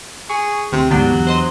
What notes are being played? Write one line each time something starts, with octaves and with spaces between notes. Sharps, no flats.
G#4 C#6
D2 C3
D2 G#2 F#3 B3 D4 G4
E2 F#6
C5 D#5 C6